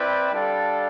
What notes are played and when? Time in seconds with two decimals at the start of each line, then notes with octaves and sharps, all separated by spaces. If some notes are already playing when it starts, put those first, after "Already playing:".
Already playing: C4 E4 B4 D5 G5
0.31 G3 D4 A4 D5 F5